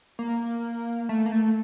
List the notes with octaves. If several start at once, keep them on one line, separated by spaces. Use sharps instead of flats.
A#3
A3
A#3
A3